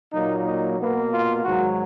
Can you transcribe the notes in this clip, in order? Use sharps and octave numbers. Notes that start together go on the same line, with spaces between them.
A#2 F#3 A#3 D#4
D#4
B2 A#3 B3
F4
G#2 D#3 F#3 F#4